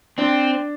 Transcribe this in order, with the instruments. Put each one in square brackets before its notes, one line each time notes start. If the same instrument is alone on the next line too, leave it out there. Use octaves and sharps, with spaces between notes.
[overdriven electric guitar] C4 [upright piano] D4